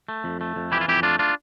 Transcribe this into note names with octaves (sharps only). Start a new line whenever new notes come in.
A3
F2
A3
F2
E3 E4 G4
F4
F2 E4 G4
A3 D4 F4
D4 F4